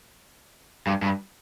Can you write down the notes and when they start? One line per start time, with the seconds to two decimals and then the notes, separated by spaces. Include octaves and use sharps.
0.87 G2
1.02 G2